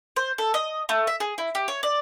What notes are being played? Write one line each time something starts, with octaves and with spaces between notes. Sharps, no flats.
C5
A4
D#5
A3
E5
G#4
E4
G4
C#5
D5